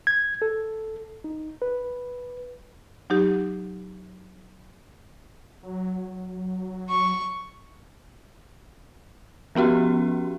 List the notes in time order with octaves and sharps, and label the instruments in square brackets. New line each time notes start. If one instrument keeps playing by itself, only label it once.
[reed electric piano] G#6
A4
D#4
B4
[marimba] F#3 D#4 G4
[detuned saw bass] F#3
[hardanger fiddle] C#6
[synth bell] F3 B3 C#4 F#4 G4